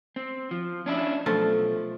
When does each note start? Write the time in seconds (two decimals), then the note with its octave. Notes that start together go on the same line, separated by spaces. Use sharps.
0.16 C4
0.51 F3
0.86 C#4 D4 E4
1.26 B1 F3 A3 F4